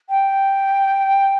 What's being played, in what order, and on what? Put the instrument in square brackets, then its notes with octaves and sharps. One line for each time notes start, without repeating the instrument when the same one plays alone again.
[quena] G5